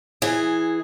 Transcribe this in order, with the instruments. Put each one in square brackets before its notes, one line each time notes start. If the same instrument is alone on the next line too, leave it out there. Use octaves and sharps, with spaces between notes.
[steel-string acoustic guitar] E3 G#4